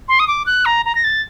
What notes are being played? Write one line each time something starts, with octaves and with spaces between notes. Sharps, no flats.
C6
D#6
D6
F#6
A#5
A#5
A#6
A6